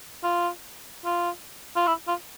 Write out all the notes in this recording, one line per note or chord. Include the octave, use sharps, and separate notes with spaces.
F4
F4
F4
E4
F4